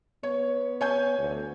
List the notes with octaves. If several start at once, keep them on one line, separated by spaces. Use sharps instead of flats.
B3 C#5
C#5 G#5 G6
D2